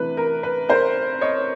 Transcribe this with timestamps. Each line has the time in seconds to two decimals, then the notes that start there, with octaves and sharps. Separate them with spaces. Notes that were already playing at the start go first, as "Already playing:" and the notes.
Already playing: C3 E3 A3 D4 B4
0.17 A#4
0.43 B4
0.69 A#4 C5
1.21 C#5 D#5